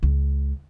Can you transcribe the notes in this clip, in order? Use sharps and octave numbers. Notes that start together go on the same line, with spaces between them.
C#2